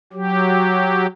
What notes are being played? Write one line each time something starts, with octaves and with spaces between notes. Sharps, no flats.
F#3 G4